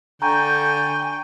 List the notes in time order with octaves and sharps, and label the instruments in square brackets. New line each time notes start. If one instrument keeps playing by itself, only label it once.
[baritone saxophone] D3 [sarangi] G5 [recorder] G#5 [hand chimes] A#5 C#6 G6